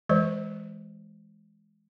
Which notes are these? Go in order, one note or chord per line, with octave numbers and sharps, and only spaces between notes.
E3 G#3 C5 D5